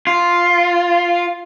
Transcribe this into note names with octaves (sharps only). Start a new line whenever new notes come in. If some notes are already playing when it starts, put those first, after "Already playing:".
F4